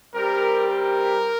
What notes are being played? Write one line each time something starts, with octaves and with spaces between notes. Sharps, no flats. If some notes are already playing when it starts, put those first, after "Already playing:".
G3 C4 G4 A#4
A#4